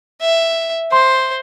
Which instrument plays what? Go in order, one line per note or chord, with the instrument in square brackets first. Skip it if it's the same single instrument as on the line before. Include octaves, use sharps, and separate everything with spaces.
[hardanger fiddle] E5
[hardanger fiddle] C5 [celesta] C6